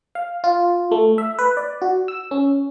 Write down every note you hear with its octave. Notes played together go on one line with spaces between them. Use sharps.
F5
F4
A3
E5
B4
D5
F#4
E6
C#4